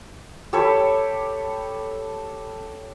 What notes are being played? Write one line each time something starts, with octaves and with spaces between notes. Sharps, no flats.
G4 A4 C#5 B5